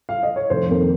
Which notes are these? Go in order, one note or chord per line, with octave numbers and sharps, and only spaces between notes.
F5
D#5
C#5
F1 C5
F2 D#3 A#3